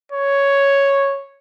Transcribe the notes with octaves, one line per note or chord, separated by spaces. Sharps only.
C#5